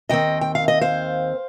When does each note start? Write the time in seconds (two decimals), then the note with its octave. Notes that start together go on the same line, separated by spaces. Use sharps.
0.09 D#2 D#3 C4 D#5 G5
0.41 G5
0.55 F5
0.68 D#5
0.81 C5 F5